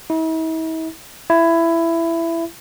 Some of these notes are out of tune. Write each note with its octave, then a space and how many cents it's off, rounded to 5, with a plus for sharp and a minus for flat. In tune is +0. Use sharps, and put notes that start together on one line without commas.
E4 -45
E4 +15